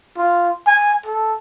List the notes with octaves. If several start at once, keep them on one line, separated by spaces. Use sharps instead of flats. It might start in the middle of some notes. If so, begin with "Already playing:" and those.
F4
G#5
A4